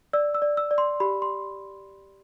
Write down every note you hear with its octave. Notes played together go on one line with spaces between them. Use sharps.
D5 E6
E6
D5
E6
D5
C6
G4 B5
C6